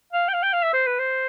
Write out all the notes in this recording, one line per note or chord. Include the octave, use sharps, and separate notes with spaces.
F5
G5
F5
G5
F5
E5
C5
B4
C5